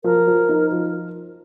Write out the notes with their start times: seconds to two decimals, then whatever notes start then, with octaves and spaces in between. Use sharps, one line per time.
0.04 F3 A#4
0.28 F3
0.49 D#4
0.72 F3